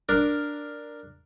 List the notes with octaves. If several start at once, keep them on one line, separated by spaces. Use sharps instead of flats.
D4 A#4